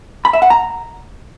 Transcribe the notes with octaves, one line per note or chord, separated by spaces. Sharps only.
B5
E5
F#5
A#5